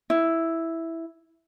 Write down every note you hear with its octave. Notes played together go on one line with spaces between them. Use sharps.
E4